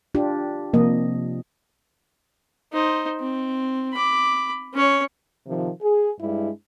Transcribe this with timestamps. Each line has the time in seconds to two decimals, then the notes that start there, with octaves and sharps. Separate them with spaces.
0.15 D4 F4 G4
0.74 C3 F3 A#3 D#5
2.73 D#4 C5
3.20 C4
3.93 B5 D6
4.74 C#4 C#5
5.47 C3 D#3 F3
5.81 G#4
6.21 G2 G#3 D4 E4